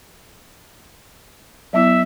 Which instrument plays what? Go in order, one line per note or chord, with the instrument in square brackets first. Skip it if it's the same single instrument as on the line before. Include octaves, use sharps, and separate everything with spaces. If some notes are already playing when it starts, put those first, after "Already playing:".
[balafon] F#3 B3 E4 [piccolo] E5